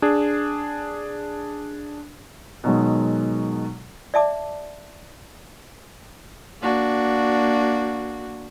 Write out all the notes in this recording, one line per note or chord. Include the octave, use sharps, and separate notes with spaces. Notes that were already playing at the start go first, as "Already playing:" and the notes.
D4 G#4
B2 D#3 F#3 G#3
D5 E5 A5 D6
A#3 D4 F#4